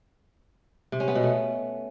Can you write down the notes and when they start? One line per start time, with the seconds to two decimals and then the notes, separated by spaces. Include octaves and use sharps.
0.92 C3
1.00 C#4
1.08 B3
1.15 B2
1.23 A3